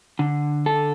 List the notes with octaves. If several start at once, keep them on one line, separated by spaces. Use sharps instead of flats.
D3
A4